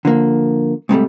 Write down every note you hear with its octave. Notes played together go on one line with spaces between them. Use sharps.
D3 F3 A#3
G#2 C3 G3 A3